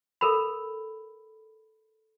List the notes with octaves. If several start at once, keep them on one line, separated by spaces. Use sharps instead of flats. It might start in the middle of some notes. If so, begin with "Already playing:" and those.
A4 A#4 B5